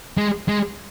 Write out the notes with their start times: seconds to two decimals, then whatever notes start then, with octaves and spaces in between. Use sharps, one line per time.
0.18 G#3
0.48 G#3